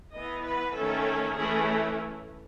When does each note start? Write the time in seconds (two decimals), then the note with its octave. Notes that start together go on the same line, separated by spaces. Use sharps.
0.13 E3 B3 D#5
0.44 B4
0.75 D#3 A3 C#4 A4
1.36 E3 A3 C#4 G#4